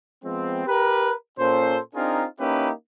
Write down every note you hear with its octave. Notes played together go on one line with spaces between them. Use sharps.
F3 G#3 B3 C4
G4 A#4 B4
A#2 C#4 A4 C5
C4 D4 D#4 F4 G#4 A#4
A#3 C#4 D#4 E4 G4 B4